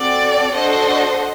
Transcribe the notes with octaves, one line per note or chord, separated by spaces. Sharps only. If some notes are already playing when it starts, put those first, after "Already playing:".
Already playing: C4 F#4 A4 D5
D4 F#4 A4 C5 D#5